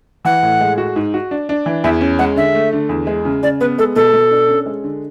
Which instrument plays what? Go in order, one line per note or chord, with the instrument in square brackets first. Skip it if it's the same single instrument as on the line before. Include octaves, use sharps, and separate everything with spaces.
[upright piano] E3 [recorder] F#5
[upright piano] A2
G#3
F#4
G#2
F#4
D4
D4
E3
[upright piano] E2 [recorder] E5
[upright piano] C#4
[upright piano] G#3 [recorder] F#5
[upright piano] D3 [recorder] E5
[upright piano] A3
D3
E2
G#3
C#3
[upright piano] C#3 [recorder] D5
[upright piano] B3 [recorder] B4
[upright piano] G#3 [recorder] A4
[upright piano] B2 [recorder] A4
[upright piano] B2
D4
C#4
G#3
D3